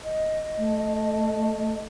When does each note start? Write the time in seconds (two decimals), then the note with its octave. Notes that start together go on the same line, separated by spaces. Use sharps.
0.04 D#5
0.57 A3